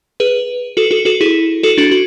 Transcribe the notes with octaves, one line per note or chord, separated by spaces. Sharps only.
G#4 B4
F#4 A4
F#4 A4
F#4 A4
E4 G#4
F#4 A4
D4 F#4
F#4